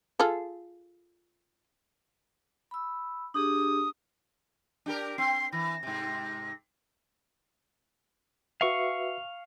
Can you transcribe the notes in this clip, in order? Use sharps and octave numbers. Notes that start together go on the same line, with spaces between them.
F4 G#4 A4
B5 E6
D4 G4 G#4 D#6
D4 G4 A#4
C4 C7
E3 A#6
G#2 C3
F#4 B4 E5 F5 C#6